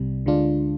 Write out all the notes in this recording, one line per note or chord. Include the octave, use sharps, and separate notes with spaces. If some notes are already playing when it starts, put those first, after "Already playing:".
Already playing: C2 C3 G3
D2 D3 G#3 D4 F4